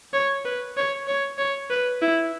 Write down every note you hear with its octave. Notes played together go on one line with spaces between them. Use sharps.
C#5
B4
C#5
C#5
C#5
B4
E4